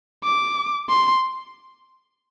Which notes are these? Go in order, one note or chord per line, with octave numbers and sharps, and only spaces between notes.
D6
C6